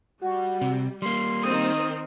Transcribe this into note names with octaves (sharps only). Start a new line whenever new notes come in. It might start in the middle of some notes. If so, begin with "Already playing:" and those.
G3 F#4
C3
G3 A#3 C6
D#3 C4 D#6